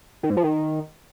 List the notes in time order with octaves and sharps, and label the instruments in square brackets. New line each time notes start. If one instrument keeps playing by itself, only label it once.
[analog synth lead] D#3
G#2
F3
D#3